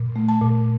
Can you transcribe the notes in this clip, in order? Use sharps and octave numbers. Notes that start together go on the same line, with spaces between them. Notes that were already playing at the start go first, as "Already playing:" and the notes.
Already playing: A#2
A3
A5
A#2